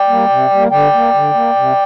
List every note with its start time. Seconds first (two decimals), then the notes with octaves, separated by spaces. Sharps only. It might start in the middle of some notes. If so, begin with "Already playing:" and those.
Already playing: D5 G5
0.08 G3 A#3
0.30 C3
0.50 G3 A#3
0.71 D3 D5 G5
0.93 A#3
1.14 D3
1.34 A#3
1.56 C3